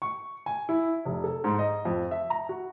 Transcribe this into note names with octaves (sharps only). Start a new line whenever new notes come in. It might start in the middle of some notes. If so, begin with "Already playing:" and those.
C#6
G#5
E4
F1
A4
G#2
D#5
F2
E5
A#5
F#4